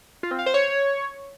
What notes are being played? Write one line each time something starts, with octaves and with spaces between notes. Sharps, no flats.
F4
C4
F5
C5
C#5